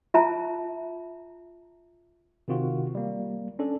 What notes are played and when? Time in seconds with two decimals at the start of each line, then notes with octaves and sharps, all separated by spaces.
0.14 F4 E5 A5 A#5
2.48 C3 D#3 C4 F4 F#4
2.95 G3 A#3
3.59 C#4 D4 A4